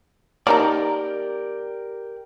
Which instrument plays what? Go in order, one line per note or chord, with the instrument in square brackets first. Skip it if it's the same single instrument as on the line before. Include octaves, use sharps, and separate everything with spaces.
[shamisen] A#3 D#4 A#5 [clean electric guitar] G4 A#4 D5